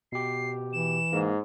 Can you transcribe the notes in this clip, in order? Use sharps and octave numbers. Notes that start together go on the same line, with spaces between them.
B2 G4 C7
E3 E7
G#2 A#3